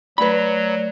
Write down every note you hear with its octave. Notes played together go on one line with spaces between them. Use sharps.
F#3 A3 B4 D5 B5